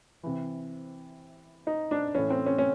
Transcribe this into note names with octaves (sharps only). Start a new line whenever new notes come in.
C3 E3
D#4
D4
A2 E3 C#4
C4
C#4
C#4